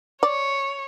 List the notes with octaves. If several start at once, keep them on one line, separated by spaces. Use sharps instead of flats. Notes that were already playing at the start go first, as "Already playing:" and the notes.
C#5 D5